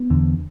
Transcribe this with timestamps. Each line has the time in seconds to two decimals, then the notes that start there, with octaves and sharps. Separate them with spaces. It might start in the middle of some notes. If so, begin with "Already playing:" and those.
Already playing: B3
0.10 E2 D3